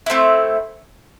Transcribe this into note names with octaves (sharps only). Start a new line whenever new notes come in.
A3 C4 E4